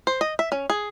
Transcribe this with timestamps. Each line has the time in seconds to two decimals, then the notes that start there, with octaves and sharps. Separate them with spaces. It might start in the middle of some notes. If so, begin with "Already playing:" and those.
0.07 C5
0.21 D#5
0.39 E5
0.52 C#4
0.70 G#4